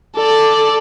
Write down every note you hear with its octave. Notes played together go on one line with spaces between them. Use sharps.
A4 D5